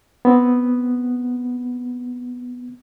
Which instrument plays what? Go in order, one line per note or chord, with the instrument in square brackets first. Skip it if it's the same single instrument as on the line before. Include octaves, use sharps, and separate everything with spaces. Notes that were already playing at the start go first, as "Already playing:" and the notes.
[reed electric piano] B3 C4